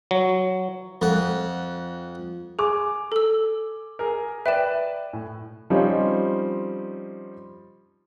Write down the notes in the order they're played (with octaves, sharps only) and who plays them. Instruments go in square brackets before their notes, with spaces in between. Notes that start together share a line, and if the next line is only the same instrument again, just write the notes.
[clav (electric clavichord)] F#3
[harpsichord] F2 F#5
[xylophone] G#4 [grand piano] G#5 D6
[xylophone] A4 E6
[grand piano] G#4 A#4
[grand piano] B4 D5 [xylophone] E5 G5 E7
[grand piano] A2
[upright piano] F3 G3 C4 C#4 D#4